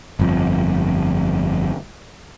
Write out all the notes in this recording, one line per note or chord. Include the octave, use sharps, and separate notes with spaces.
G1 F2